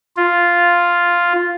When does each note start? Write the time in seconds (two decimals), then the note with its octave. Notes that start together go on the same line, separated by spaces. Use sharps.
0.17 F4